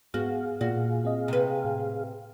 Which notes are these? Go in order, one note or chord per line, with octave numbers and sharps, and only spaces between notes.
G#2 B3 F#4 G#4 F5
A#2 F#4
C4 D#5
C3 B4
A2